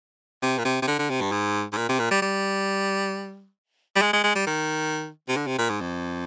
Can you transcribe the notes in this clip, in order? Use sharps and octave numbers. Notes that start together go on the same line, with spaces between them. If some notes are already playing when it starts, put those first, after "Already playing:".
C3
A#2
C3
C3
D3
D3
C3
G2
G#2
G#2
A#2
C3
A#2
G3
G3
G3
G#3
G#3
G#3
G3
D#3
C3
D3
C3
A#2
G#2
F2